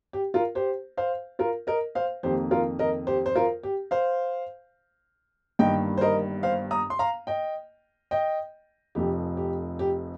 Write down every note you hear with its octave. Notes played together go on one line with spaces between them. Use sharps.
G4
F4 A#4
G4 C5
C5 F5
F4 A#4
A#4 D#5
C5 F5
F2 D#3 A#3 G4 C5
F4 A#4
A#4 D#5
G4 C5
C5
F4 A#4
G4
C5 F5
G1 G2 D#3 G3 A#3 D#5 G5
C5
A#4 D#5
C5 F5
A#5 D#6
C6
F5 A#5
D#5 G5
D#5 G5
F1 F2 F3 G4
G4
G4